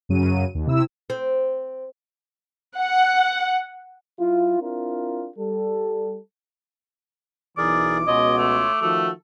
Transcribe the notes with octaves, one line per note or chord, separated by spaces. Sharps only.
F#2 C#3 F#3 D#7
D#2
C3 E4 E6
C4
F#5
F#3 E4 F4
C4 D4 E4 F4 A#4
G3 A4
B1 E3 G#4 A#4 D5 D6
C#2 B2 F4 C#5 D#5
A3
D#3 F3 A3 F#4 A4